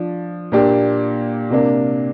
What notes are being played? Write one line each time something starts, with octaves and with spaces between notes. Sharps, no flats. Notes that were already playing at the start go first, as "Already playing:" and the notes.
Already playing: F3 D4
A#2 A#3 D4 G4
C3 A#3 D4